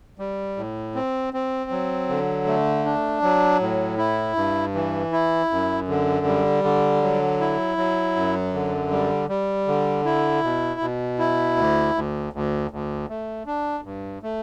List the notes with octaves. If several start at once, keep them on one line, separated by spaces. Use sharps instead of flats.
G3
A2
C4
C4
F#3
D3
A3
D4
F#3
A2
E4
G2
E3
E4
F#2
D3
G3
D3
F#3
E4
F#3
F#2
D3
G3
G3
D3
E4
B2
B2
E4
D2
D2
D2
D2
A3
D4
G2
A3